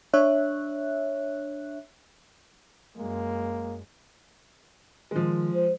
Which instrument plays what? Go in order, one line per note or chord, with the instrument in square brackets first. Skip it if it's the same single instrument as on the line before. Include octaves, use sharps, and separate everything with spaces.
[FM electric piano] D4 C#5 E5 F#6
[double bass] F#2 G#3 [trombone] A#3
[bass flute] D#3 [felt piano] F3 G#3
[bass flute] C5